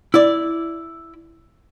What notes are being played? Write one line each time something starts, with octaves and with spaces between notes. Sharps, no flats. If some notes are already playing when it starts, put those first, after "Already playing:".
E4 D5